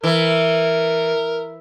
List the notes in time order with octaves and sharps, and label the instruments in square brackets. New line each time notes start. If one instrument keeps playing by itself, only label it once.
[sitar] E3 [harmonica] A#4